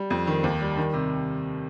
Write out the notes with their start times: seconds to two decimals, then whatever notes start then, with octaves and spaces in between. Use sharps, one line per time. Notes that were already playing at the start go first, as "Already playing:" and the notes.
Already playing: G3
0.10 F2
0.27 D#3
0.44 D#2
0.61 G3
0.77 D#3
0.94 C3